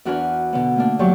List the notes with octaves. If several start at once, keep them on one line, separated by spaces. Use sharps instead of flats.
E2 D4 F#4 A#4 B4 G#5
B2 D3 B3
A3 A#3 D4
E2 G2 F#3 G4 D5 C#6